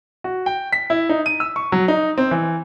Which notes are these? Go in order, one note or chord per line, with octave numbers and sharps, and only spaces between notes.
F#4
G5
B6
E4
D#4
D#7
E6
C#6
F#3
D#4
C4
E3